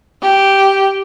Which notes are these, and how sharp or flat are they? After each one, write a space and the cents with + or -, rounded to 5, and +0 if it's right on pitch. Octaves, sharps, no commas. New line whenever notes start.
G4 -5